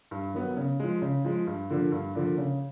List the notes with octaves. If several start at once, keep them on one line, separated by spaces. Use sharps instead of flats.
G2
D#3 F#3 B3
C#3
F3 G#3
C#3
F3 G#3
G2
D3 F3 A#3 D4
G2
D3 F3 A#3 D4
C#3